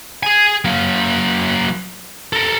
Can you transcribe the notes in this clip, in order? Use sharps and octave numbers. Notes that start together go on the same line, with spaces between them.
G#4 G#5
F#3 A#3
A4 A#4